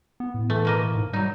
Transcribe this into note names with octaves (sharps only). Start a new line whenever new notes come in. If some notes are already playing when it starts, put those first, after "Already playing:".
B3
A2
E3 A3
B2 A#3 D#5
G#2
F#3 G3 D#4